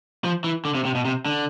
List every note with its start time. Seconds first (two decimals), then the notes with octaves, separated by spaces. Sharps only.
0.25 F3
0.44 E3
0.65 D3
0.75 C3
0.85 C3
0.95 B2
1.05 C3
1.26 D3